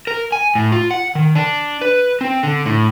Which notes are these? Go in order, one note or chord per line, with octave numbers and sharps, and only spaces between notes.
A#4
G#5
A2
F4
F#5
D#3
D4
B4
C4
D3
A2